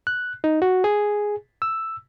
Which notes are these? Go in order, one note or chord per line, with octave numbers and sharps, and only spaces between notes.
F#6
D#4
F#4
G#4
E6